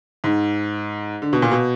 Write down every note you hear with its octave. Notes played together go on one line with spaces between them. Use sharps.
G#2
D3
B2
A#2
B2